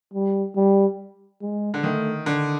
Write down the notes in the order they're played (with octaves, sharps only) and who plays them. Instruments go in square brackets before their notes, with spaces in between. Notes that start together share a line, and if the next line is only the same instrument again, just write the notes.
[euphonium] G3
G3
G#3
[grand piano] D3
[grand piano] D#3 [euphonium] A3
[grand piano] D3